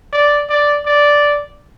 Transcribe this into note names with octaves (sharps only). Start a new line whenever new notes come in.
D5
D5
D5